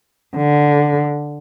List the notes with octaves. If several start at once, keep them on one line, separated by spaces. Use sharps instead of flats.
D3